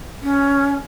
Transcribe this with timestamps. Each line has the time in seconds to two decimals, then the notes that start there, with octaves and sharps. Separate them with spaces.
0.23 C#4